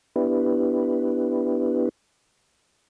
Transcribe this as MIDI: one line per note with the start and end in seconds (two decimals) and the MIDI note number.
0.16 1.89 59
0.16 1.89 62
0.16 1.89 64
0.16 1.89 67
0.16 1.89 71